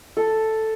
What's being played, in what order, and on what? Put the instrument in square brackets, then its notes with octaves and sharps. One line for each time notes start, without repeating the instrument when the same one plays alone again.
[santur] A4